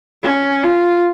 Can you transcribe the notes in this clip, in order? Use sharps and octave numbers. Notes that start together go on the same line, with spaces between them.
C#4
F4